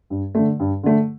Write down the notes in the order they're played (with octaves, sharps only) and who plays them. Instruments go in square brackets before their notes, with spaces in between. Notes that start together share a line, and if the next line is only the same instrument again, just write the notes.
[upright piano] G2
D3 A3
G2
D3 A3